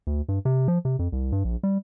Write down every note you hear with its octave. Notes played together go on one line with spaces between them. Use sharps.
D2
G2
C3
F3
C3
F2
C2
G2
A#1
G3